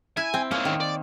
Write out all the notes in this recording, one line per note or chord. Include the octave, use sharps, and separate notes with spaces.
E4 G#5
C4
A#3 C#4 D#4
D#3
D5